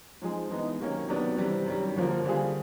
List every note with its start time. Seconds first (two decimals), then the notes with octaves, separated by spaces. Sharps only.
0.22 F3 G#3 C4 D#4 G#4
0.50 E3 G#3 B3 D#4
0.79 C3 D#3 F#3 A#3 C#4
1.09 C3 D#3 F#3 B3 D4
1.37 C3 E3 G3 C4
1.66 F#2 D#3 G3
1.96 D#2 D3 F3 A#3
2.25 D3 G3 C4 F4 G#4